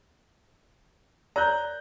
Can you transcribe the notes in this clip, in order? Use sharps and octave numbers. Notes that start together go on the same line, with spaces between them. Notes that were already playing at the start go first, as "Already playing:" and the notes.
A#4 C#5 D5 A#5 F#6 G6